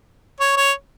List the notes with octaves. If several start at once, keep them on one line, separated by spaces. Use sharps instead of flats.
C#5
C#5